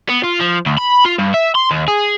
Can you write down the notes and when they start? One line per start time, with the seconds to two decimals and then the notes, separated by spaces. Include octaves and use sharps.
0.10 B3
0.24 F4
0.41 F3
0.66 D2
0.78 B5
1.05 F4
1.18 G2
1.34 E5
1.55 C6
1.71 D#2
1.88 G#4